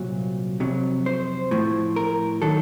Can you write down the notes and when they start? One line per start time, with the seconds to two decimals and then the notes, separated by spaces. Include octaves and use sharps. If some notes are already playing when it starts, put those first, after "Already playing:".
Already playing: C2 A#2 F#3
0.60 F2 C3 F#3
1.06 C5
1.51 A2 F3
1.96 A#4
2.42 D#3 F#3 A4